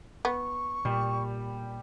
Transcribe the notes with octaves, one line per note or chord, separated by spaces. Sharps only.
B3 C#6
A#2 G3